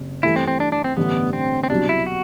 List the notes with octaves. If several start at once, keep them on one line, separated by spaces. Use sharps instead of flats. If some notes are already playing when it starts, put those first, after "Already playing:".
Already playing: F#1 C3
G2 E3 A3 E4
C4
C4
D4
D4
C4
A1 G2 D3 A3 B3 D4
C4
C4
C2 B2 F#3 D4
E4
F#4